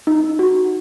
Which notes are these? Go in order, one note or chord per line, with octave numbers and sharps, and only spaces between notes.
D#4
F#4